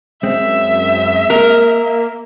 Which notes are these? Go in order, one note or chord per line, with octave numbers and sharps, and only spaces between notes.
F#2 G#3 C4 E5
A#3 A#4